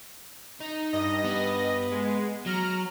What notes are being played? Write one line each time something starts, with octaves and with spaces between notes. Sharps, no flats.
D#4
G2 D#5 A#6
B3
G#3
F#3 A#5 F6